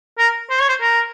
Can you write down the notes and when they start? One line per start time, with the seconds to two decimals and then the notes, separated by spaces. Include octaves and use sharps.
0.19 A#4
0.50 C5
0.60 C#5
0.69 C5
0.81 A#4